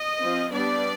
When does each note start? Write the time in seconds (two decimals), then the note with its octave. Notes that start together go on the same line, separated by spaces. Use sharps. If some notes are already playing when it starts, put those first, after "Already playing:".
Already playing: D#5
0.20 F3 C4
0.51 G3 B3 D4 D5